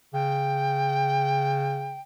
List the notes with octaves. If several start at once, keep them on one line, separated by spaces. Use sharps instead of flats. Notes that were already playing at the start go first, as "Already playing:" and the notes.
C#3 G5